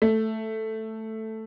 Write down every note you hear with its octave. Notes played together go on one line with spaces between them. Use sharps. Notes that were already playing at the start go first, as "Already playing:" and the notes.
A3